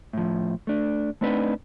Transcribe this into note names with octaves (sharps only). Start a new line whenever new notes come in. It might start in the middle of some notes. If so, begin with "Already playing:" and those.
A2 F3
A3 D4
A3 C4 D4 D#4 B4